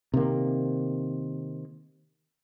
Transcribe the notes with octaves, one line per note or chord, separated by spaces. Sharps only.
C3 D#3 A#3